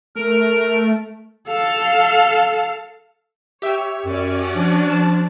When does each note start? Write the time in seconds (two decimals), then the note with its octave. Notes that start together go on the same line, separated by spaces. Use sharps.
0.16 A3 A#4
1.48 A4 F5
3.62 G4 C#5 E5
4.05 F#2 C#4 F#4 D5
4.55 F3 D4
4.89 F3 A5